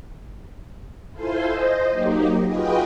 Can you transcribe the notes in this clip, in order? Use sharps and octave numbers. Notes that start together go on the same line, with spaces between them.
E4 F4 A4 C5 G#5 C6
C5 D#5
F#3 A#3 D#4 G4
F4 F#4 G#4 B4 D#5 G5